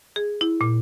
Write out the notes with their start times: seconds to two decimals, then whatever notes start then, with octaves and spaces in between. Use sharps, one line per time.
0.16 G#4
0.41 E4
0.61 A#2